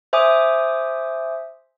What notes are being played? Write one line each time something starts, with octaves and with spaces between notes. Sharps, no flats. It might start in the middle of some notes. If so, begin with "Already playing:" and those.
C5 E5 G#5 D6 D#6